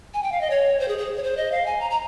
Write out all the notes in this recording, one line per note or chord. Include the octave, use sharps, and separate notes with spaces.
G#5
G5
F5
D#5
C#5
C5
G#4
G#4
C#5
C5
D#5
F5
G#5
A#5
A#5